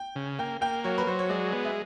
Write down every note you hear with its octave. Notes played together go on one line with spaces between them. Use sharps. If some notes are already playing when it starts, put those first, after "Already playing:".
Already playing: G5
C#3
A#3 G5
A#3 G5
F#3 C#5
B4
F#3 C5
C#5
G#3 D5
B3
E5